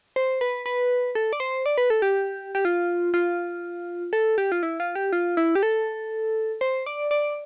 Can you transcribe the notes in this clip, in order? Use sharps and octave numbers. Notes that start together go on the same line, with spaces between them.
C5
B4
B4
A4
D5
C5
D5
B4
A4
G4
G4
F4
F4
A4
G4
F4
E4
F4
G4
F4
E4
G4
A4
C5
D5
D5